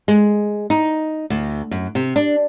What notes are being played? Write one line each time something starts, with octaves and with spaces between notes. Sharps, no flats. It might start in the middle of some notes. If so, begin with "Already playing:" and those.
G#3
D#4
D2
F#2
C3
D4